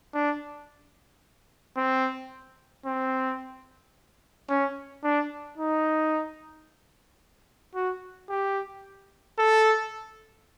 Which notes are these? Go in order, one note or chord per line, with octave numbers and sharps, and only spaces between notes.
D4
C4
C4
C#4
D4
D#4
F#4
G4
A4